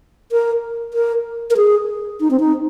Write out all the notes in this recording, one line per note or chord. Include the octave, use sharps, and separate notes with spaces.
A#4
A#4
A#4
G#4
D#4
C4
D#4